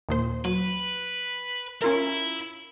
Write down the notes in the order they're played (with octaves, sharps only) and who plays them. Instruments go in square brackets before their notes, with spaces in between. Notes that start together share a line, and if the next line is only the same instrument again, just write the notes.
[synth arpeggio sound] D#2 A#2 C5
[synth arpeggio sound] F#3 [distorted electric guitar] B4
[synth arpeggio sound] C#4 F4 A#4 [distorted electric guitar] E4